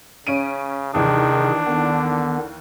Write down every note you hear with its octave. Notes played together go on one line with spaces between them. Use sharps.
C#3 C#4 D7 D#7
D#2 C3 D#3 E3 D4 G#4
D3 D#3 B3